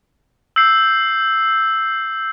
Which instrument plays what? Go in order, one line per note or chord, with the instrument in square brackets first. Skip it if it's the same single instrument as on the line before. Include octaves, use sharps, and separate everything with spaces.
[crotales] E6 G6 C7